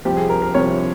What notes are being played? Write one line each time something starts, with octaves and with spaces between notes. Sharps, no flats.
C2 C3 F3 G4
G#4
A#4
A#4
C2 C3 F3 C#5